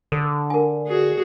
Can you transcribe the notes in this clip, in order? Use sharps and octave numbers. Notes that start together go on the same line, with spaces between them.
D3 A4
A#4 G#5
F#4 G#4